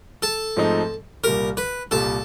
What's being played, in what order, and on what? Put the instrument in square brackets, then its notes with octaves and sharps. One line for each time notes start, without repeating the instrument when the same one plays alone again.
[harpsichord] A4
[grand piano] G#2 F3 A3 C4 D#4
[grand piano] C2 A#2 G3 [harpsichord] A#4
[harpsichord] B4
[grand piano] C2 A#2 G3 [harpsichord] A4